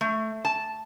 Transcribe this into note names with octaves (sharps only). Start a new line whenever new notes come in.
A3
A5